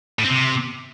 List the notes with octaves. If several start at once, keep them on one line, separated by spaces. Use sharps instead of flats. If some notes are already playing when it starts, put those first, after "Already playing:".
A2
C4
C3